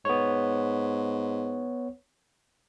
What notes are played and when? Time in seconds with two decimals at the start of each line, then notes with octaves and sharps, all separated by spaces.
0.05 G#2 B3 C#5